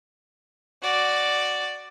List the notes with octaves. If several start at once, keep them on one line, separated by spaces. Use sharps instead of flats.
F#4 D5